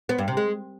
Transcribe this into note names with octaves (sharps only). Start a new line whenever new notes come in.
B3
G2
C3
G#3